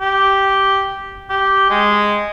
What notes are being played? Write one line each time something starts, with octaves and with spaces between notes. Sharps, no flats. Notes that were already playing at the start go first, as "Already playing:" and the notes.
G4
G4
G#3